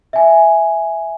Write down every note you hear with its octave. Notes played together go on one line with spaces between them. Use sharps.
E5 G#5